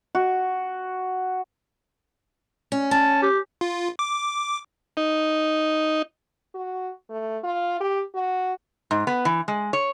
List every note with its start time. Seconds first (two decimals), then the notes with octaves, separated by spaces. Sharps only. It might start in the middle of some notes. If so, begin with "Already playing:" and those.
0.15 F#4
2.72 C#4
2.91 C#4 A5
3.22 G4
3.61 F4
3.99 D6
4.97 D#4
6.55 F#4
7.10 A3
7.44 F4
7.81 G4
8.15 F#4
8.91 G#2
9.07 B3
9.25 E3
9.48 G#3
9.73 C#5